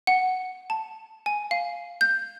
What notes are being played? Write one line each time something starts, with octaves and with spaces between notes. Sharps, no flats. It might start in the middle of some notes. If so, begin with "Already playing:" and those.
F#5
A5
G#5
F5
G6